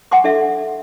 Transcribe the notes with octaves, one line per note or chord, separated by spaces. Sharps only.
F#5 G#5 C6 D6
D4 A4 E5